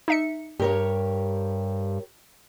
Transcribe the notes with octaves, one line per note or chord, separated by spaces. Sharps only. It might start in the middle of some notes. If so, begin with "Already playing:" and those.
D#4 E5 C#7
G2 G4 A#4 C#5